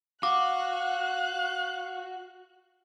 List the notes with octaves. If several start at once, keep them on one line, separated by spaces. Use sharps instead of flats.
F#4 F5 D6 F#6